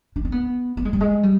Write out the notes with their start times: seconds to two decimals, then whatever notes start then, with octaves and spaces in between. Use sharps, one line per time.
0.16 D4
0.25 C4
0.32 B3
0.77 B3
0.85 G#3
0.93 G3
1.01 G#3
1.23 G3